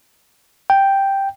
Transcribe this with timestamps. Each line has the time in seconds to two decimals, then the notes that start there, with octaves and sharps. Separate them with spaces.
0.70 G5